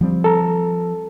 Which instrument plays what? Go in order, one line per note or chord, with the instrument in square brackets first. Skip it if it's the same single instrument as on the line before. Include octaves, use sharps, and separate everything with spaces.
[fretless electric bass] F3 G3 C4
[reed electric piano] A4 A#5